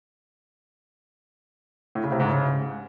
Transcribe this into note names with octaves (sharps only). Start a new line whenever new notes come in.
A2
C#3
C3
G#2
C#3